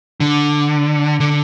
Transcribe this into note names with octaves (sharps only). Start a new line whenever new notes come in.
D3
D3